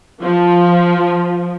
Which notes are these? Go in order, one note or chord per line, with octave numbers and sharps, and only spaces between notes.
F3